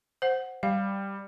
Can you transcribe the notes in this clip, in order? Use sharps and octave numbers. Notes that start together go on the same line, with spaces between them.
C5 F#5
G3 F5